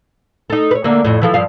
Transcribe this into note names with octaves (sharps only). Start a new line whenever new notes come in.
D#4 A4
B4 C#5
D3 A3 A#3
F2 A2
E3 F3 A4
G2 F3 F5